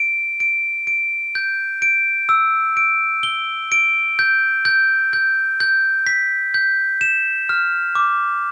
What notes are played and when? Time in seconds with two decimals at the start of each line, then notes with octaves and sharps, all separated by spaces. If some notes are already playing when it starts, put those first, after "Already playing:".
Already playing: D7
0.40 D7
0.87 D7
1.35 G6
1.82 D7
2.29 E6
2.77 D7
3.23 G7
3.72 D7
4.19 G6
4.65 G6
5.13 G6
5.60 G6
6.07 B6
6.54 G6
7.01 E7
7.49 F6
7.95 D6